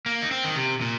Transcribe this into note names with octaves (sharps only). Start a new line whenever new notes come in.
A#3
D#4
C4
D#3
C3
A#2